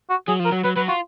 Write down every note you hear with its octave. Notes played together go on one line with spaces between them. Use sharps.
F#4
F#3 G#4
F3
A#4
F#3
F#3 B4
F#3 B4
F4 F#4